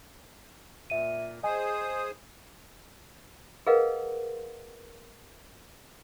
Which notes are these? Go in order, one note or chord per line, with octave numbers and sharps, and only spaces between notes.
A#2 E5 D#7
G#4 C5 D#5 G#5 D#6
G#4 A#4 B4 D#5 F5 F#5